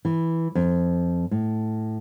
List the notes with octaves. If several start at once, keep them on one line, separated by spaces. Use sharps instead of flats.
E3
F2
A2